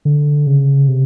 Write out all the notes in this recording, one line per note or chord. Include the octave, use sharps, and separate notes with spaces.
D3
C#3
C3